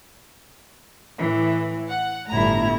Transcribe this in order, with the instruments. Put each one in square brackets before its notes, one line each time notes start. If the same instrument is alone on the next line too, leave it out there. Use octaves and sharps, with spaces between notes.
[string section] A2 E3
F#5
[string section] G1 A#5 [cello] A2 E4